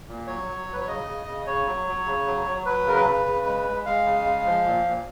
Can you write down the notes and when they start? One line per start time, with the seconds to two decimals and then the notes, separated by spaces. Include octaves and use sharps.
0.08 A#2
0.27 F#3 C#5
0.48 F#3
0.68 F#3
0.73 B4
0.81 C#5
0.87 C#3 D#5
1.07 C#3
1.27 C#3
1.47 C#3 C#5
1.67 F#3
1.87 F#3
2.06 C#3
2.26 F#3
2.46 F#3
2.66 F#3 B4
2.86 C#3 A#4
2.96 B4
3.06 C#3
3.25 C#3
3.46 G#3
3.66 G#3
3.85 G#3 F5
4.05 C#3
4.26 G#3
4.45 F3
4.65 A#2
4.85 A#2